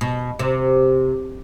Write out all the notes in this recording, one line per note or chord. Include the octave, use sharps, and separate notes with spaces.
B2
C3